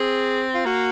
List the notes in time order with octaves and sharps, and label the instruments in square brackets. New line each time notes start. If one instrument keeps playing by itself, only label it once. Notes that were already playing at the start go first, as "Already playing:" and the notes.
Already playing: [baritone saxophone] C4 [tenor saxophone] G#4
[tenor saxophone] F4
[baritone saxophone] A#3 [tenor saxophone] F#4